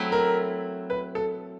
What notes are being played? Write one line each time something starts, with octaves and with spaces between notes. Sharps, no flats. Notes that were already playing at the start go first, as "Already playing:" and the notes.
Already playing: F#3 A3 C4 E4
A#4
B4
A4